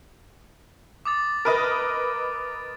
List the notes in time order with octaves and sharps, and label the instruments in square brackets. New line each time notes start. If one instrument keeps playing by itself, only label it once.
[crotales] D6 D#6 A6
[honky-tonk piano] A#4 B4 D#5